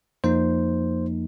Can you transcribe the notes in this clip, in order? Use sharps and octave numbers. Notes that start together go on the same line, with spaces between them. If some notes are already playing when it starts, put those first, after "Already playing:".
F2 F3 A#3 D#4 C5